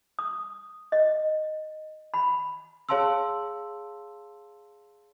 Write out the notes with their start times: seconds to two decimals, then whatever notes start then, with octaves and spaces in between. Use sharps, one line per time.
0.19 D#6
0.92 D#5
2.14 B5
2.89 G#4 C#5 F5 A5 C6 E6